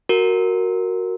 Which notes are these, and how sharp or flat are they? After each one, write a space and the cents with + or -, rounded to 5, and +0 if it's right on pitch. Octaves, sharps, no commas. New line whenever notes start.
F#4 +0 A#4 -10